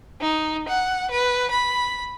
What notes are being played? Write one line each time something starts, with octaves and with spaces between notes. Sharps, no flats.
D#4
F#5
B4
B5